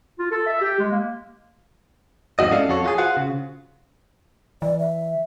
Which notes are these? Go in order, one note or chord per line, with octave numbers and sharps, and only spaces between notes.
F4
A4
E5
G4
G#3
A#3
F2 G#2 C3 F#4 D#5
C#4 E4 A4 D5 F5
F2 F#4 A4 C#5
F4 F#4 G#4
F4 F#4 G#4 C5 F5 F#5
C#3
E3 D5
E5